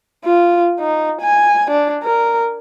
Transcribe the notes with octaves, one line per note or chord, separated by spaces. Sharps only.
F4
D#4
G#5
D4
A#4